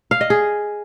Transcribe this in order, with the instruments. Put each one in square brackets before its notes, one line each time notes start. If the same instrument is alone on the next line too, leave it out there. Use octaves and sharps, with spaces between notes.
[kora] F5
D#5
G#4